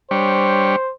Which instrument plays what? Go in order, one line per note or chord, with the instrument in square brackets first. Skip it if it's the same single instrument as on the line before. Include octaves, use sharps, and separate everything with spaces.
[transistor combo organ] G3 D4 C#5 [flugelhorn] C5